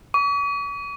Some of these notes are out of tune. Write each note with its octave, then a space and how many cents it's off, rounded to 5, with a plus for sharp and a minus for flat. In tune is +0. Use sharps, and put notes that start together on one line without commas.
C#6 +45